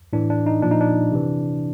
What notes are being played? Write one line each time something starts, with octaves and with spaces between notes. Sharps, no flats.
A2 E3 D4
D4
D#4
A#2 F3 D4
D#4
D4
C3 E3